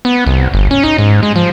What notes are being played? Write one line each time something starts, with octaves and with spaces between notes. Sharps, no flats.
B3
C2
G1
C#4
D#4
G#2
G#3
F3